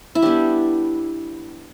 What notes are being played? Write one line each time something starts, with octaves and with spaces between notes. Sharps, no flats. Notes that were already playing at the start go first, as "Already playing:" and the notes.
E4
G3 B3 D4 G4